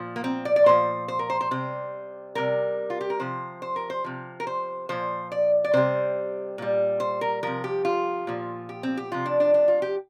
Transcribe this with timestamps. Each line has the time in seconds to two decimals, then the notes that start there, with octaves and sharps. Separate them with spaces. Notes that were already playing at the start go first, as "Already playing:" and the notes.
Already playing: A#2 F3
0.16 A#3
0.24 C4
0.45 D5
0.56 D5
0.66 A#2 F3 C5
1.08 C5
1.19 A#4
1.30 C5
1.41 C5
1.51 C3 G3 C5
2.35 C3 G3 A#4
2.90 F4
3.01 G4
3.10 A#4
3.20 C3 F3 C5
3.62 C5
3.76 A#4
3.90 C5
4.04 C3 F3
4.40 A#4
4.47 C5
4.89 A#2 F3 C5
5.32 D5
5.64 D5
5.74 C3 G3 C5
6.58 A#2 G3
7.00 C5
7.21 A#4
7.43 C3 F3 A#4
7.64 G4
7.85 F4
8.27 A#2 F3
8.69 G4
8.83 C4
8.97 G4
9.11 C3 F3 F4
9.26 D4
9.40 D4
9.54 D4
9.68 F4
9.82 G4